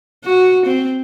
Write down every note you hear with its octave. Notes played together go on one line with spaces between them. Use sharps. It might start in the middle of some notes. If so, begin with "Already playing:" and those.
F#4
C4